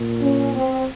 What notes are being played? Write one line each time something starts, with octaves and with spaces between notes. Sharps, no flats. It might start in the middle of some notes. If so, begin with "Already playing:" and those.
Already playing: A#2
C#4
C4